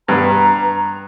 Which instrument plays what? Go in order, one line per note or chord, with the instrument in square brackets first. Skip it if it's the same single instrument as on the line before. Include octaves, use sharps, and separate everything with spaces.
[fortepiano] G2 B3 [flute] A#5